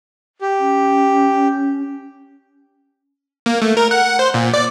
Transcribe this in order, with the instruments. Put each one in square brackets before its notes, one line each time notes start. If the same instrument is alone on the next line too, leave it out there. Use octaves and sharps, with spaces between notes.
[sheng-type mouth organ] G4
[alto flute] C#4
[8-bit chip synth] A#3
A3
A#4
F#5
F#5
C5
A#2
D5